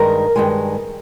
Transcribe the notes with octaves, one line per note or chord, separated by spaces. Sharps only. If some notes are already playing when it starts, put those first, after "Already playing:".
Already playing: G2 D#3 G#3 A#4
G2 D#3 G#3